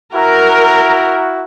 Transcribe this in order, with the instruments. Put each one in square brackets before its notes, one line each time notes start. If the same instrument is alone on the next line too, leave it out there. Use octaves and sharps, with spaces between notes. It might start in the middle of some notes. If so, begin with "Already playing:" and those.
[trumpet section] E4 F#4 [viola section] A#4